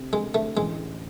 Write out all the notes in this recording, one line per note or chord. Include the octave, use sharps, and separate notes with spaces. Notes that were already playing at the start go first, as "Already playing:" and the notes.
Already playing: D2 C3
D2 G#3
D2 A3
A1 G#3
A2